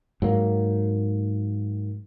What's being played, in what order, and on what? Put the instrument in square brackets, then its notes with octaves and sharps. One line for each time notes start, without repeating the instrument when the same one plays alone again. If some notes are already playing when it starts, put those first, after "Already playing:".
[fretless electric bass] G#2 F#3 A#3